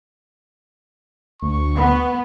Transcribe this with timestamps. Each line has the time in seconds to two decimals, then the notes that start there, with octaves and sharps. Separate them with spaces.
1.42 D2 C#6
1.75 B3